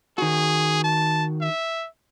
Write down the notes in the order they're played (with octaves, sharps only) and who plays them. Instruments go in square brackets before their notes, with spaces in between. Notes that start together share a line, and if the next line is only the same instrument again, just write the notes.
[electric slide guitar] D#3 F#4 [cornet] G#4
[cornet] A5
E5